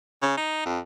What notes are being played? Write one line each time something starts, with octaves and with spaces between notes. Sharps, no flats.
C#3
D#4
F2